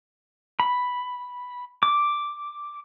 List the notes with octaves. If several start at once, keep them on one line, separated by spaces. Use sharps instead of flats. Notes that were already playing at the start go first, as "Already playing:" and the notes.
B5
D6